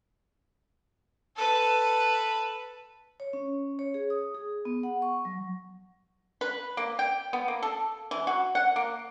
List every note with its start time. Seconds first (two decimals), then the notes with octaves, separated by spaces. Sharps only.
1.36 A4 B4
3.20 C#5
3.33 C#4
3.79 C#5
3.94 G#4
4.10 D#6
4.35 G#4
4.65 B3
4.83 F#5
5.02 C#6
5.25 F#3
6.41 B4
6.77 A#3
6.99 G5
7.33 B3
7.48 A#3
7.63 A4
8.11 E3
8.27 F#4
8.55 F#5
8.76 A#3